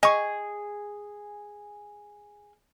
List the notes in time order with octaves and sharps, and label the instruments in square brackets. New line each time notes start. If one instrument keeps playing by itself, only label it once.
[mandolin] G#4 [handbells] D#5 C#6